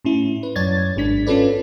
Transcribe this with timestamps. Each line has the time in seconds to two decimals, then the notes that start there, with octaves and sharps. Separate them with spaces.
0.05 A2 C#4 E4
0.43 B4
0.56 F#2 C#5 D5 G#6 A6
0.96 G#1 G#2 D4 B6
1.27 C#4 F4 A4 B4 D5